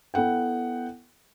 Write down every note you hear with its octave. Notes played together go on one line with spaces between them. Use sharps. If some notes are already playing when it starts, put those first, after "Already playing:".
B3 E4 A4 F#5 G5